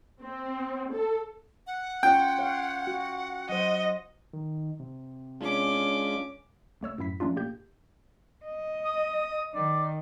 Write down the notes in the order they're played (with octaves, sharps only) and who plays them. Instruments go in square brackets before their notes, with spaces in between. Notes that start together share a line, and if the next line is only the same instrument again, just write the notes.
[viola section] C4
A4
[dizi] F#5
[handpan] C#4 F4 C#5 [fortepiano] G5
[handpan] C#5 F5
F#4
[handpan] F#3 C5 [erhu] D#5
[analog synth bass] D#3
C3
[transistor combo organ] G#3 D4 F4 [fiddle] C#4 D6
[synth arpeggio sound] C#2 A3 C#5 E6
F#2 A2 E4 B6
F3 A3 C#4 D4 F4
A#2 A#3 G4 G6
[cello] D#5
[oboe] D#6
[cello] D#3 [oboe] D5